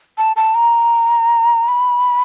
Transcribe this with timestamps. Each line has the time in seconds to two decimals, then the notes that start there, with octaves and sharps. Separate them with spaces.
0.18 A5
0.36 A5
0.55 A#5
1.68 B5